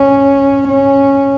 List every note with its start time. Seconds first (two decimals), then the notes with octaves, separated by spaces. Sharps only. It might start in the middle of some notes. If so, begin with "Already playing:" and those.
Already playing: C#4
0.68 C#4